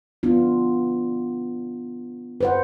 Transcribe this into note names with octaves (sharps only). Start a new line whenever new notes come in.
B3 D4 F4
B4 C5 F#5